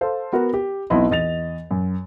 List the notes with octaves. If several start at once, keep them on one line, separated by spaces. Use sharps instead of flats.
A4 C5 F5
B3 F#4 A#4
G4
B1 B3 C4 E4 D#5 C6
E2 D#5 A6 F7
F#2